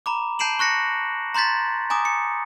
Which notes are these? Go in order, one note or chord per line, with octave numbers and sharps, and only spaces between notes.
A#5 B5 D6
A5 G6 C7 D7 E7 F#7
C#6 F#6 A#6 C#7
A#5 C6 G6 A6 B6
G#5 A#5 D6 D#6
C#7